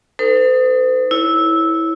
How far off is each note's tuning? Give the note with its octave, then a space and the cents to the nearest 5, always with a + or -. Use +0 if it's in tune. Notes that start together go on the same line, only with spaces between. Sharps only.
D#4 +0 A4 +30 C5 -45
E4 -10 C#5 +0